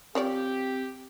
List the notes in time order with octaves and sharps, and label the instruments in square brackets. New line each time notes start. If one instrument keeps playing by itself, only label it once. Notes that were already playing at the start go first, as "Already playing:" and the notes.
[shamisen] F3 C#5 D5 [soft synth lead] C4 [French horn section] G4